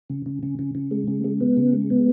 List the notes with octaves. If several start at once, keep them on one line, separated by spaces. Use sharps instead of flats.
C#3
C#3
C#3
C#3
C#3
G#3
C#3
G#3
B3
C#3
G#3
B3